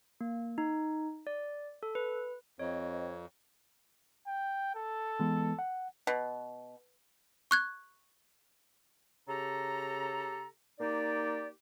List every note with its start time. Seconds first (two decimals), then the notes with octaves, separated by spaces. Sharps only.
0.21 A#3
0.58 D#4
1.27 D5
1.83 A4
1.95 B4
2.59 F2 C4 C#5 D#5
4.27 G5
4.75 A4
5.20 E3 G#3 B3
5.59 F#5
6.07 B2
7.51 C#6 F#6 G#6
9.28 C#3 G4 A4 A#5
10.79 A#3 D#4 G4 D5